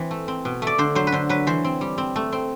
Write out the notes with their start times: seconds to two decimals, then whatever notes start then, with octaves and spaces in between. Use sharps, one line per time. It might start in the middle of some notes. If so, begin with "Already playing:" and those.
Already playing: E3 C4
0.11 A3
0.28 C4
0.45 B2
0.62 A3 D5
0.78 D3 C5
0.95 F#3 C5
1.07 B4
1.12 D3 C5
1.29 F#3 B4
1.47 E3 C5
1.64 C4
1.81 G3
1.98 C4
2.16 A3
2.32 C4